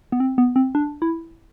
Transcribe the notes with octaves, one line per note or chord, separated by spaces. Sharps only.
B3
C4
B3
C4
D4
E4